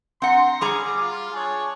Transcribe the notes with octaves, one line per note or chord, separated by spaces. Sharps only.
C4 F#5 A#5 C6
G3 C#4 G#4 A#5 D6
F4
D4 G#4 C#5